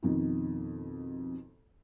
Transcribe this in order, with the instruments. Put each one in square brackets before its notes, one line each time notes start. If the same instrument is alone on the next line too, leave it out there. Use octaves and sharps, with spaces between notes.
[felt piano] F2 B2 D#3